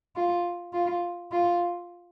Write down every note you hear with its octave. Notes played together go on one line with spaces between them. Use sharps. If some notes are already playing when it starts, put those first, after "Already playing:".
F4
F4
F4